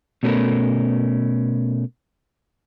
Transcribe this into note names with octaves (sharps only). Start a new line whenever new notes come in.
B2 A3 C#4 G#4 A#4 B4